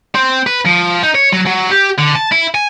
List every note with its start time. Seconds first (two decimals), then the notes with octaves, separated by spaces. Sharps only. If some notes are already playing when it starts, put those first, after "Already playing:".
0.15 C4
0.46 B4
0.66 F3
1.03 D#4
1.15 C#5
1.32 F#3
1.46 F#3
1.71 G4
1.98 D3
2.15 A5
2.31 E4
2.54 G#5